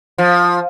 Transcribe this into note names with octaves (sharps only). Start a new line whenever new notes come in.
F3